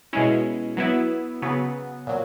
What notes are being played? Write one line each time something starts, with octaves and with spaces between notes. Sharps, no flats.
B2 G#3 C#4 E4
F#3 B3 E4
C#3 F#3 B3
A#2 F#3